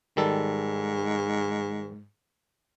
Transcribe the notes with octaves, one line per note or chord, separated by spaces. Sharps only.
G#2 D#3 G3 A4